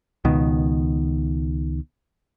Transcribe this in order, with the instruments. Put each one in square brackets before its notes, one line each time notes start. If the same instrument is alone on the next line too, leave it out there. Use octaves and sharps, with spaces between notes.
[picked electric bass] C#2 B2 D#3